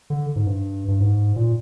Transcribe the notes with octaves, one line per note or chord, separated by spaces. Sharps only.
D3
G#2
G2
G2
G#2
A#2